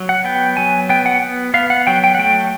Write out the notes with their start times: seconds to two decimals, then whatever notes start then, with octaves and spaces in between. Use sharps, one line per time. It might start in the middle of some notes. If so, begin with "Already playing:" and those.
Already playing: F#3
0.09 F#5
0.24 B3 G5
0.57 F#3 G#5
0.89 B3 G5
1.06 F#5
1.22 B3
1.54 B3 F5
1.70 F#5
1.87 F#3 G5
2.04 G5
2.15 F#5
2.19 A3 G5